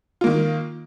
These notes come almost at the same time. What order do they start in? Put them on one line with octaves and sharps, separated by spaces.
F4 A#3 D#3